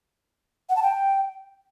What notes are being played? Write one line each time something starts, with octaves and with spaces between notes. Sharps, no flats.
F#5
A5
G5